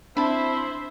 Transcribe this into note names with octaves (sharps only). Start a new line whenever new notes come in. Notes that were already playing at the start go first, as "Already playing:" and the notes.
C4 D4 E4 C5 E5 A5 B5